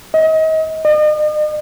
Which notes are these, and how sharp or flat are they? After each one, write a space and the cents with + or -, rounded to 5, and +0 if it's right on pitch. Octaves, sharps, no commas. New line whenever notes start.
D#5 +35
D#5 -40